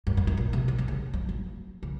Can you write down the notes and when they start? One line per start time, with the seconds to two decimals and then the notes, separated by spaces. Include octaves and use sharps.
0.07 F#2
0.17 F2
0.27 F#2
0.37 A#2
0.53 C3
0.68 D#3
0.78 D#3
0.88 C#3
1.14 F3
1.29 F#3
1.83 C#3